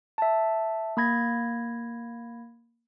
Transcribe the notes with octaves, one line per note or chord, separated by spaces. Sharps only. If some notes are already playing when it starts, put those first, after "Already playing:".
E5 A5
A#3 B5 G#6 A#6